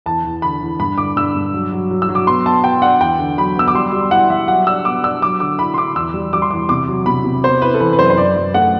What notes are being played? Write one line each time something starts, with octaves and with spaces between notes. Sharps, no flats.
E2 A5
E2
D3 B5
E2
G2 B5
D3 D6
G2 E6
G2
F#3
F#3
F#3
E6
F#3
D6
B3 C6
B3 A5
B3 G5
D4 F#5
E2 G5
D3
F#3 B5
B3 E6
D6
G3 C6
G3
E4 F#5
G3 E5
F#3 F#5
D4 E6
B3 D6
D4 E6
F#3 D6
D3 D6
E4 B5
C6
E4 D6
E2 E6
G3
G3 D6
C6
E2 D6
C3 D6
F#3
C3 B5
C3
B3 C5
E4 B4
A4
E3 B4
B4
F#2 C5
C5
F#2 D5
F#2
A3 F#5